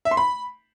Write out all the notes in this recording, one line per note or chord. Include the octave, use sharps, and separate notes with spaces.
E5
C6
B5